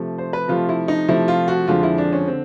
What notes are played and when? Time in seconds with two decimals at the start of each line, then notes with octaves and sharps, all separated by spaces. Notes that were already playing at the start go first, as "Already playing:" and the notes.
Already playing: C3 F3 A3
0.18 C5
0.33 B4
0.48 C3 F3 A3 F4
0.69 E4
0.88 D#4
1.08 C3 F3 A3 E4
1.28 F4
1.48 F#4
1.67 F2 D3 F3 G#3 F4
1.83 E4
1.98 D4
2.13 C#4
2.28 D3 C4